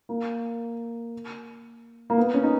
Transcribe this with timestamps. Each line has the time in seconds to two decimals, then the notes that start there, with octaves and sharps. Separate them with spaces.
0.09 A#3
2.10 A#3
2.18 B3
2.34 C#4
2.43 D#4